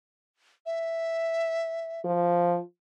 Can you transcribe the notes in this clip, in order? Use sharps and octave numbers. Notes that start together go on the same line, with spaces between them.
E5
F3